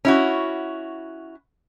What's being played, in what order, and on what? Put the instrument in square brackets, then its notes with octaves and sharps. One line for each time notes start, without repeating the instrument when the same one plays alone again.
[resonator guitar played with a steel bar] C#4 E4 F#4